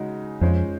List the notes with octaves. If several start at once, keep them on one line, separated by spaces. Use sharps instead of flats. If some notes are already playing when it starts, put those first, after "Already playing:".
Already playing: C#3 G#3 D#4 F#4
F2 G#3 C#4 F4 C5